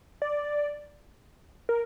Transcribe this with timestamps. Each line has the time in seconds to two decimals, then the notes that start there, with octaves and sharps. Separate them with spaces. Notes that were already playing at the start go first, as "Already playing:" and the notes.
0.22 D5
1.69 A#4